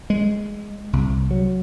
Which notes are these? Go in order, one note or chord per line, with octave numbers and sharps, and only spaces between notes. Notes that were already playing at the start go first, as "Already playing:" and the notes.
G#3
C2
F#3